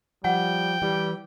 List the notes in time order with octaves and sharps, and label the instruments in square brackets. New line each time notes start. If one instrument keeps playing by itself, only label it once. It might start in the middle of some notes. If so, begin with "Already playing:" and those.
[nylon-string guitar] F3 [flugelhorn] G3 [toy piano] F#5 [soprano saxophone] G5
[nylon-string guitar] E3 G4 [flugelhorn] G3